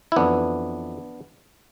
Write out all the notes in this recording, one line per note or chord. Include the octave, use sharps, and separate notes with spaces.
E4
F2 E3 B3 D4